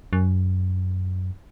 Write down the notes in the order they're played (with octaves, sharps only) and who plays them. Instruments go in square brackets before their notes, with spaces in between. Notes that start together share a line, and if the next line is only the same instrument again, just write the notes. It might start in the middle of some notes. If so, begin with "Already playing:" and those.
[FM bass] F#2